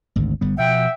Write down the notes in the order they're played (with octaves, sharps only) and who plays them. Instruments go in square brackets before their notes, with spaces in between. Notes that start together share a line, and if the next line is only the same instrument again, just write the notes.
[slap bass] G#1 D2
G1 G3 B3
[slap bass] B2 F3 [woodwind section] E5 F#5 G5